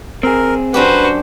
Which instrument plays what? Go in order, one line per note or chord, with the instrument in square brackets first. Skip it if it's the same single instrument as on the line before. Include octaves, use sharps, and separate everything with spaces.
[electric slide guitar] C4 G#4 [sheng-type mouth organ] A#4
[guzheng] F#2 D4 G4 [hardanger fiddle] F#4 C5 [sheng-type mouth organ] B4